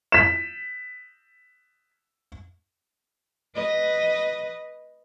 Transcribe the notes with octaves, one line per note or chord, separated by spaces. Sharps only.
B6 E7
B4 D#5